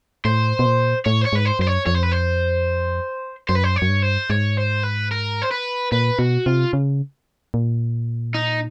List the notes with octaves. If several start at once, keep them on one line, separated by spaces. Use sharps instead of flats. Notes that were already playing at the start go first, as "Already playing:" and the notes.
A2 C5
B2
A#2
A2 C#5
C5
C#5
G#2 B4
C5
F#2 C5
C#5
F2 C#5
C5
B4
C5
F#2 C5
B4
C5
C#5
F#2
G2
C5
G#2 C#5
C5
B4
A#4
C5
B4
A#2 B4
B2 F#4
C3 F4
C#3
A#2
D#4